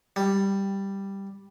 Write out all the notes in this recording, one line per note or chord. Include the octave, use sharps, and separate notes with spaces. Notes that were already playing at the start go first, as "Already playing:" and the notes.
G3